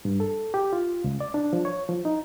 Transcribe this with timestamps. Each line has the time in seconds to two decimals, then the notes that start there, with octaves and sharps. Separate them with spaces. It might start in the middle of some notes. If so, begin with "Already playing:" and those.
0.05 G2
0.20 A4
0.54 G4
0.73 F4
1.04 C#2
1.20 D5
1.34 D4
1.53 F3
1.65 C#5
1.88 F3
2.05 D#4